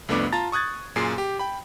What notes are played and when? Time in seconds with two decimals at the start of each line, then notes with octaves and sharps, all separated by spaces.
0.09 C2 F2 A3 B3 D4 D6
0.32 F4 A5 A#5 A6
0.52 C#6 D#6 F#6 G#6 A6
0.96 F#2 A#2 G#4 C6 C7
1.18 G4
1.39 G5 B5